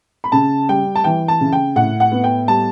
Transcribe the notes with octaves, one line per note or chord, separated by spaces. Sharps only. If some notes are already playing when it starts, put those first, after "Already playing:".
B5
C#3 A5
G3 G5
A5
E3 G5
A5
C#3
G5
A2 F#5
F#5
B3
G5
G3 A5